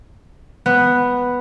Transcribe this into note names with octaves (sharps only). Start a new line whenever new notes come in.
B3